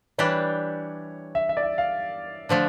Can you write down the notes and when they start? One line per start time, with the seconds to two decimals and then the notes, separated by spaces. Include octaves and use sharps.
0.18 E3 G3 D4 G4 C#5
1.35 E5
1.49 E5
1.57 D5
1.63 E5
1.78 F5
2.49 D3 F3 A3 D4